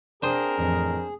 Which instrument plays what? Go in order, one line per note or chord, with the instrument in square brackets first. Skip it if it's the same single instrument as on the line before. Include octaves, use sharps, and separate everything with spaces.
[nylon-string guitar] C4 F5 [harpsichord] D4 C5 D#6 [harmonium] G#4 [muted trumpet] A#4
[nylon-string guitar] F2 A2 E3